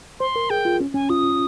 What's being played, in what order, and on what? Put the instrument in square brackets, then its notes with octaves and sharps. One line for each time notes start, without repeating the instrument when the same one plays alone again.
[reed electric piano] C5 [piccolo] C6
[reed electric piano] A#4
[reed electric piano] G#4 [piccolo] G5
[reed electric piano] F4
C#4
[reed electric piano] C#4 [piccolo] G#5
[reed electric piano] F4 [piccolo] D#6